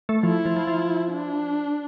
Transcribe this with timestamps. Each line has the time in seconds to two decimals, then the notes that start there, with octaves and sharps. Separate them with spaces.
0.09 A3
0.23 F3 E4
0.46 F3
0.57 F3
0.68 F3
1.12 D4